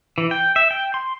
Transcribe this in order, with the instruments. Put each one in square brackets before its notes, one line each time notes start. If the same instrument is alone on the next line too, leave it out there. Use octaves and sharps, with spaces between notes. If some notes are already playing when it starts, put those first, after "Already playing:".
[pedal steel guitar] E3
G5
E5
G5
C6